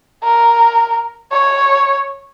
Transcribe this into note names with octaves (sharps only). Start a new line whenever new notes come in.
A#4
C#5